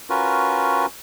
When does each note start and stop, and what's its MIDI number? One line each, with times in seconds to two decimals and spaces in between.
0.10 0.86 61
0.10 0.86 65
0.10 0.86 66
0.10 0.86 70
0.10 0.86 71